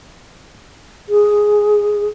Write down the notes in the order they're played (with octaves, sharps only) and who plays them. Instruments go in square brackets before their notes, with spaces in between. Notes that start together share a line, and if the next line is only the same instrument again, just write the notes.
[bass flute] G#4